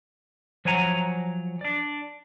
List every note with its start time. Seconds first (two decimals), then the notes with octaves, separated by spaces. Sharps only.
0.65 F3 F#3 C#5 F#5 G#5 A#5
1.61 D4 D5